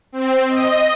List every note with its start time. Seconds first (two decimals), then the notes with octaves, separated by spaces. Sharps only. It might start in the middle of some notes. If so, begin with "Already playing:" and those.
0.12 C4
0.48 D#5